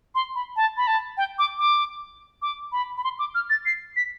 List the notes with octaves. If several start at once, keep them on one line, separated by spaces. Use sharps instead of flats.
C6
B5
A5
B5
A5
G5
D6
D6
D6
B5
B5
C6
D6
F6
A6
C7
B6